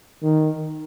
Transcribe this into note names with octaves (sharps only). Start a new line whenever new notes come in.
D#3